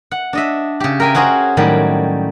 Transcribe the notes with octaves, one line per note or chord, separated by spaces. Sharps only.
F#5
D4 D#5 E5
C#3 G4
A#4 E5 G5 G#5
C#4 F#4 G#4 A#4 C5
A2 D#3 F#3 G3